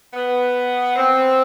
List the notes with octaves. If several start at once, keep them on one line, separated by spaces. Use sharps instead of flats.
B3
C4